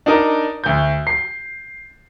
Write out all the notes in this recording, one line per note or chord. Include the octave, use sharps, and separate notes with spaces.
D4 D#4 A#4 D#5
D2 G6
C7